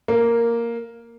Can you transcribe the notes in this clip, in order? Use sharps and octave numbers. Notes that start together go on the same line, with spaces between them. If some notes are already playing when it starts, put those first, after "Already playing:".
A#3